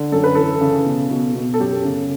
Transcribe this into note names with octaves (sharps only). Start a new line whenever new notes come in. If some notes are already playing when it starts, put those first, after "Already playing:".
Already playing: D3
F#2 A4
B4
E3 A4
C#3
B2
B2
B2
A4
F#2 G4
C#3